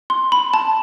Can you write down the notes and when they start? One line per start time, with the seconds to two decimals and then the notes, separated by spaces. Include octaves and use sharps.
0.10 C6
0.32 B5
0.54 A5